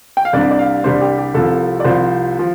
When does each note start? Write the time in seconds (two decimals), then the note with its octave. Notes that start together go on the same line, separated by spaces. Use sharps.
0.17 G5
0.25 F5
0.33 C2 C3 G3 D4 D5
0.51 D5
0.59 F5
0.84 C2 C3 G3 D4 C5
1.01 G4
1.18 G4
1.34 C2 C3 F3 A4
1.80 D5
1.85 C2 C3 F3 C5
2.39 F3